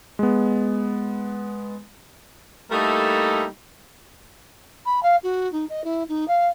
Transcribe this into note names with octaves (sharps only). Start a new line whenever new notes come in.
G#3 B3
G3 A3 A#3 D#4 E4 A4
B5
F5
F#4
D#4
D#5
E4
D#4
F5